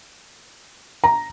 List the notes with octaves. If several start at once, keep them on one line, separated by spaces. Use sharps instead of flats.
A#5